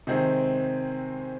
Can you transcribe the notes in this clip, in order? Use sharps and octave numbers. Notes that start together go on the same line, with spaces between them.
C3 D#3 G#3 C4